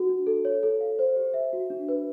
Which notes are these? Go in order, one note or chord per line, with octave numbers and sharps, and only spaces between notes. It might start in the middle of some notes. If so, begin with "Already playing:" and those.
Already playing: F#4
D4
A4
C#5
A4
F5
C5
G4
E5
F#4
D4
B4